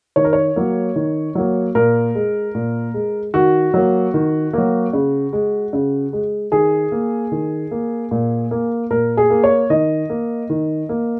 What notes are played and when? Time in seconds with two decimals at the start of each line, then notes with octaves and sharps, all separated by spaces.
0.16 D#3 C#5
0.24 A#4
0.33 C#5
0.56 F#3 A#3
0.96 D#3
1.35 F#3 A#3
1.75 A#2 A#4
2.15 G#3
2.55 A#2
2.94 G#3
3.34 D#3 F#4
3.74 F#3 A#3
4.14 D#3
4.53 F#3 A#3
4.93 C#3
5.33 G#3
5.73 C#3
6.13 G#3
6.52 D#3 G#4
6.92 A#3
7.32 D#3
7.71 A#3
8.11 A#2
8.51 A#3
8.90 A#2 A#4
9.17 G#4
9.30 A#3
9.44 C#5
9.70 D#3 D#5
10.10 A#3
10.50 D#3
10.89 A#3